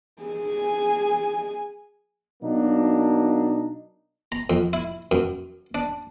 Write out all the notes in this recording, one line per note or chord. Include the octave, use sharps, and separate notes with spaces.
G#4 G#5
B2 F#3 A#3 D4 D#4
A#5
F2
E4
F#2
D4